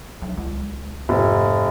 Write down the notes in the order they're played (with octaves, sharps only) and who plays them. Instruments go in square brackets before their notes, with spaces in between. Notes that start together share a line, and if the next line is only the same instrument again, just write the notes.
[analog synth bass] B1
C#2
[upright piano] F1 [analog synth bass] G#2